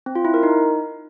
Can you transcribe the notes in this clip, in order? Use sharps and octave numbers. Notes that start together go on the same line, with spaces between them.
C4
F4
E4
A#4
D#4